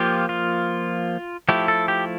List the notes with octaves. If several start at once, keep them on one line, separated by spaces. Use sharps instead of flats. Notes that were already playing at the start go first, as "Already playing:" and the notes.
Already playing: F3 A#3 F4 G4
F4
F3 A3 E4 G4
A4
G4